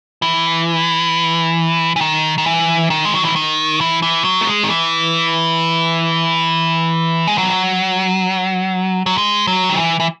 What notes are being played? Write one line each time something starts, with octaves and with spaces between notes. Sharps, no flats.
E3
E3
D#3
D#3
E3
D#3
G#3
F#3
E3
D#3
E3
E3
F#3
A3
G#3
D#3
E3
G#3
F#3
F#3
G#3
F#3
D#3
E3
E3